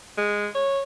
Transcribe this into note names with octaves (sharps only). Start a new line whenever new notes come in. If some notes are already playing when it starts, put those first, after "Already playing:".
G#3
C#5